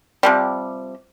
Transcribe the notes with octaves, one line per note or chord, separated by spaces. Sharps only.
C3 F3 G3